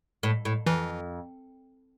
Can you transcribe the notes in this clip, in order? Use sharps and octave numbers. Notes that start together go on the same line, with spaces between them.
A2
A2
F2 E3